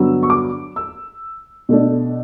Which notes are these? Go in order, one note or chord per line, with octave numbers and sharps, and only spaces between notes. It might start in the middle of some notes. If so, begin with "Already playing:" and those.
Already playing: G2 D3 F#3 B3 E6
C#6
D6
E6
B2 A3 D4